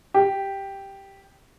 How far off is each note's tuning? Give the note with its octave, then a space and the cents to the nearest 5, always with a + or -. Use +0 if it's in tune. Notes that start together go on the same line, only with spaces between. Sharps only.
G4 +0